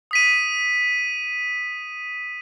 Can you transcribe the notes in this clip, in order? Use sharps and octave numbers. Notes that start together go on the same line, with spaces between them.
D#6 B6 D#7